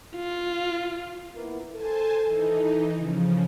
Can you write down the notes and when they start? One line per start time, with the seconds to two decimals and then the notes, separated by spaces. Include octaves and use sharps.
0.16 F4
1.36 A#3 B3 E4
1.74 A4 C5 G#5 A5
2.26 E3 D#4
2.95 C#3 F3